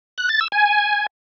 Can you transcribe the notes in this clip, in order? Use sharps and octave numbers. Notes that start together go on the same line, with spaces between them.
F#6
A6
E6
G#5